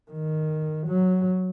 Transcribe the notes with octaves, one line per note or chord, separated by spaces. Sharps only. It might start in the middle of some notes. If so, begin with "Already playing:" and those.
D#3
F#3